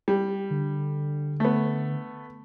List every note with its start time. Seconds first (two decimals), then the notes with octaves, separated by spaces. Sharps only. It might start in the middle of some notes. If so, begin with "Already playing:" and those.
0.08 G3
0.50 D3
1.40 A3 B3